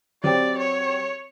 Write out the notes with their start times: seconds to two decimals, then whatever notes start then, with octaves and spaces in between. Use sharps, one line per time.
0.24 F#3 C4 G4 D5
0.58 C#5